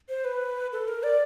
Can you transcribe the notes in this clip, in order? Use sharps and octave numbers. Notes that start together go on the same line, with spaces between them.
C5
B4
A4
A#4
D5